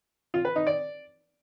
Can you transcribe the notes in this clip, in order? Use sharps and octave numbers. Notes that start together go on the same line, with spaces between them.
F4
B4
D#4
D5